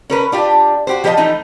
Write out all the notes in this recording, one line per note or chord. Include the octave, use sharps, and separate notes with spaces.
C#4 A#4 B4
D4 F4 G4
F#4 G4 C5
F3 G4 A#4 D5 D#5 A5
E3 F3 A3 D#4